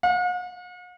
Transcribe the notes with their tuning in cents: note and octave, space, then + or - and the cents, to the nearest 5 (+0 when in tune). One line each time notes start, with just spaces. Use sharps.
F#5 -45